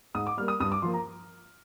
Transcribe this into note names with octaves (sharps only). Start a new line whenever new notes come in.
G#2 D#6
D6
G3 A#3 F6
D#6
G2 D#6
D6
F3 A#3 C6
A#5